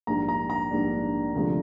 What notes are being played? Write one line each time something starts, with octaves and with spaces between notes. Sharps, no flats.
A#1 G#2 G3 A#3 D4 A#5
A#5
A#5
A#1 G#2 G3 A#3 D4
D2 C3 F3 G#3 D4